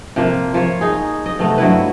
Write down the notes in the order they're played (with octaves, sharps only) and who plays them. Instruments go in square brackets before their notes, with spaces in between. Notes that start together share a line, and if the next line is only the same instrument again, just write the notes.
[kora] C3 F3 A#3
F3 C#5
D#4 G#4
D#5
C3 A3 B3
G2 F#3 E4 B4